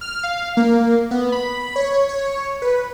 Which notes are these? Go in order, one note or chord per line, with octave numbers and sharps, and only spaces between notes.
F6
F5
A#3
B3
B5
C#5
C#5
B4